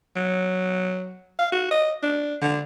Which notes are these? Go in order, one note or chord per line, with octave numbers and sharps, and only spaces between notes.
F#3
F5
F#4
D#5
D4
D3